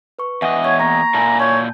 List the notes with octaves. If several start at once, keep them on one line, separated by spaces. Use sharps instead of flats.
B4 C#6
E2 D#5 E5 F#5 G#5
C#5 G#6
A#3 G5 A#5 C#6
A#2 E4 G#5 A5
C#5 A5 G6